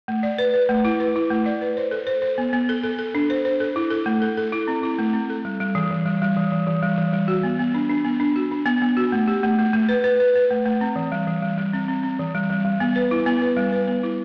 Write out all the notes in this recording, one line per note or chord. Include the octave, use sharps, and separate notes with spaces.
A3
D5
B4
B4
A3
E4
B4
E4
A3
D5
B4
C5
A4
C5
C5
B3
B3
A4
A4
A4
D4
C5
C5
A4
E4
A4
A3
A4
A4
E4
C4
E4
A3
C4
A4
G3
G3
E3
E3
G3
G3
E3
E3
E3
G3
E3
G3
F#4
B3
B3
D4
D4
B3
D4
F#4
D4
B3
B3
F#4
A3
G4
A3
A3
A3
B4
B4
B4
B4
A3
A3
C4
E3
G3
E3
G3
G3
C4
C4
C4
E3
G3
G3
G3
B3
B4
E4
B3
B4
G3
B4
B3
E4